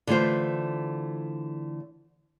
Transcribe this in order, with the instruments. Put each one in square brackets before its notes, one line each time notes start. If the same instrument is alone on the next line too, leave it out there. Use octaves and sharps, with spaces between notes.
[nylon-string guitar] D3 E3 A3 F4 C5